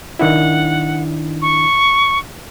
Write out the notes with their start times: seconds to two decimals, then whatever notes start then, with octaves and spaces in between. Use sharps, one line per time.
0.19 D#3 D4 E4 F#5
1.42 C#6